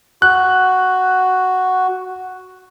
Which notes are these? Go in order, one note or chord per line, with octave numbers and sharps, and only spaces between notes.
F#4 F#6